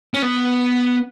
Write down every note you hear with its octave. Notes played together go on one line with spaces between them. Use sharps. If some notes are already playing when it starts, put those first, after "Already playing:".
C#4
B3